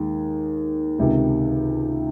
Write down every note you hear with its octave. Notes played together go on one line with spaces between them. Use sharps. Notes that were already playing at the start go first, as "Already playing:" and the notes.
Already playing: D#2 D#3 G#3
C#2 C3 D#3